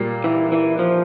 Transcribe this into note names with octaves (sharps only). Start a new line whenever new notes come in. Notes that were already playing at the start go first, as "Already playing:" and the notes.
Already playing: A#2 G3 A#3
E3
E3
F3